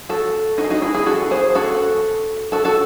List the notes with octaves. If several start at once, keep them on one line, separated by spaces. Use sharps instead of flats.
F#4 A4
D#4 F#4
G#4
D#4 F#4
E4 G#4
E4 G#4
F#4 A4
G#4 C5
F#4 A4
F#4 A4
F#4 A4